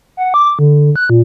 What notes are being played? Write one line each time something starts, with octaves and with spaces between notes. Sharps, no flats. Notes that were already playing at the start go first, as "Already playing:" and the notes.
F#5
D6
D3
F#6
A#2